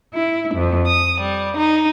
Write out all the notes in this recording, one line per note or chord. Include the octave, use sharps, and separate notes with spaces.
E4
F2
D#6
G3
D#4